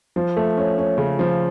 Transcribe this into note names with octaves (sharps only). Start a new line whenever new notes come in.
F3
A3
C#4
C#4
C#3
F3